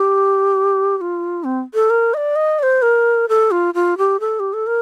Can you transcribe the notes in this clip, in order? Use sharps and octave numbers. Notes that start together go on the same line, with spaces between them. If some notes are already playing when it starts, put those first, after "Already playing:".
Already playing: G4
G4
F4
C4
A4
A#4
D#5
D5
D#5
D5
C5
A#4
A4
F4
F4
G4
A4
G4
A4
A#4